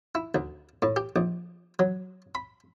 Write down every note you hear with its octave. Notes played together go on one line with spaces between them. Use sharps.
E4
D2
A2
G4
A#1
F#3
B5